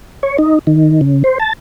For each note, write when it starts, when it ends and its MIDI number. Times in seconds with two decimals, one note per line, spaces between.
0.23 0.37 73
0.38 0.59 63
0.67 1.01 51
1.01 1.23 49
1.24 1.38 72
1.40 1.53 81